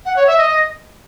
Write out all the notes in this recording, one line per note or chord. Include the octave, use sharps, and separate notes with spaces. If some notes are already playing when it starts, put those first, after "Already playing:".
F#5
C#5
E5
D#5